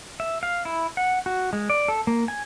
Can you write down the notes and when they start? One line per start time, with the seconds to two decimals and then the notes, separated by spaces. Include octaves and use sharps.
0.20 E5
0.43 F5
0.65 E4
0.97 F#5
1.26 F#4
1.53 G#3
1.70 D5
1.88 A4
2.07 A#3
2.28 G#5